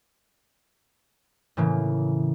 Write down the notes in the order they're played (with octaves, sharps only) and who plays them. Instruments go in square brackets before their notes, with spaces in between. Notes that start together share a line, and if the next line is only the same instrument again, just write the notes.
[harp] A2 C#3 E3 A#3